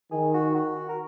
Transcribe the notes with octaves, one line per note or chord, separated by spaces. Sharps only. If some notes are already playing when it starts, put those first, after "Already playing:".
D#3 G#4
F#4
F#4
A#4